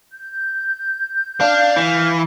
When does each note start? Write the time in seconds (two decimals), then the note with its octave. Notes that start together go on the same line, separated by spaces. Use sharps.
0.12 G6
1.41 D4 F5
1.76 E3